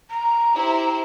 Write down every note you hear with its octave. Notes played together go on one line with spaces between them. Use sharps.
A#5
E4 G4 C5